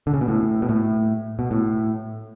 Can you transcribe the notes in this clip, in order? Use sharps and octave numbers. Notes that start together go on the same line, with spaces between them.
D3
C#3
B2
A2
B2
A2
B2
A2